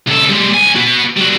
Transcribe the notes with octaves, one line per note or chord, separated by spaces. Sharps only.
C#2 A4
G3 G#3
C2 G#5
F#4 B4
G3 F#4